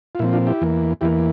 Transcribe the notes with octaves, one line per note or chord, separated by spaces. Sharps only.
F4
A#2 F3 C4 E4
D4 F4
E4 G4
E2 E3 A#3
E2 E3 A#3 E4 G4